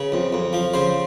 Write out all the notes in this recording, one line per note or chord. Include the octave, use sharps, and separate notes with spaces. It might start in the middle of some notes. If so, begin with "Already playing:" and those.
Already playing: C#3 B4
F2
F2
F3
C#3 C5